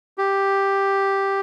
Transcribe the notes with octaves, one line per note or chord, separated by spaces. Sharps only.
G4